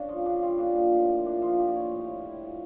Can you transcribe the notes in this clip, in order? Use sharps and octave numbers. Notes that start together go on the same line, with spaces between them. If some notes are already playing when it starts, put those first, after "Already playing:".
Already playing: C#3 D4
F3
C#3 D4
G3 F4
A#2 D4
F3
A2
F3
A#2 D4
F3 F4
A#2 G4
D5
F3 C#5
A2
G3
A2 E4
F3